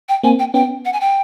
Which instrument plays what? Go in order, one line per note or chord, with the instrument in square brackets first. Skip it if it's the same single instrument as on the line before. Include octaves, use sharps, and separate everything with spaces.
[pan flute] G5
[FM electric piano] A#3 C4 [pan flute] G#5
[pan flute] G5
[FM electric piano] B3 C#4 [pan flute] G5
[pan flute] F#5
G#5
G5